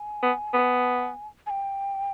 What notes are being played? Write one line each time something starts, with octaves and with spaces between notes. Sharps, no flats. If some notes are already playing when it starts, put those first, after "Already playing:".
Already playing: G#5
B3
B3
G#5
G5